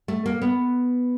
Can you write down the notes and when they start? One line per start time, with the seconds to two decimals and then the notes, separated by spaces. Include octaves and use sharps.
0.08 A3
0.26 A#3
0.42 B3